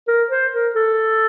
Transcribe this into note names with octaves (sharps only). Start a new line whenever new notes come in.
A#4
C5
A#4
A4